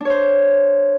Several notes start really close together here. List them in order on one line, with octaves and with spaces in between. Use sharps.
D4 C#5 C5